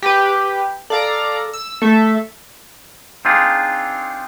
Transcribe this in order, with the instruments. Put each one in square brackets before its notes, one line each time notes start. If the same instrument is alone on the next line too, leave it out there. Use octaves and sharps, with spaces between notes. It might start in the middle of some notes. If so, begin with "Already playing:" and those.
[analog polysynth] G4 B4
[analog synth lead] A4 [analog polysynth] D5 F5 A#5
[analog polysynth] E6
[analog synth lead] A3 [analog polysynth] A4 E5
[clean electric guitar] C4 D4 D#4 F4 G#4